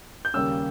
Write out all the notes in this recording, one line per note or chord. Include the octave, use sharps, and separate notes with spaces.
G6
D#2 C#3 G3 A#3 C#4 E6